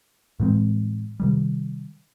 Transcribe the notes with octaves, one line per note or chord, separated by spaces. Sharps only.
A2 E3 G#3 C4
C3 D#3 G3